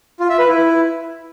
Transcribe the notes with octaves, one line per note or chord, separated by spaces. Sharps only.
F4
E5
B4
E4